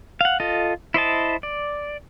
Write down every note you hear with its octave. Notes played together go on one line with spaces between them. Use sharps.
F5 F#5
F4 A4 D#5
E4 C5 D#5 A5
D5